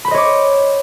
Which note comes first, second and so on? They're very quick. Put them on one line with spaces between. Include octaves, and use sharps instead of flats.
B5 C5 D#5 C#5 D6